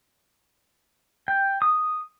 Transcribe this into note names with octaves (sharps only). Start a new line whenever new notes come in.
G5
D#6